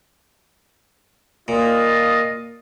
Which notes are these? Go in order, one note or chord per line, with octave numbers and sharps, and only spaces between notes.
A#2 F4 D#5